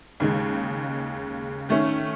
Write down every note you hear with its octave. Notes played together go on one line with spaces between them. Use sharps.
D#2 C#3 G#3
D#3 A3 C#4